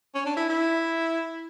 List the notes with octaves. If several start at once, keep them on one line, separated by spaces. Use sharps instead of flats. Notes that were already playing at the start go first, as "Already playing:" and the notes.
C#4
D4
E4
E4